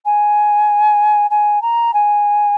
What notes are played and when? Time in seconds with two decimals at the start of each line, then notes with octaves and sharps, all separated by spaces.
0.05 G#5
1.30 G#5
1.61 A#5
1.93 G#5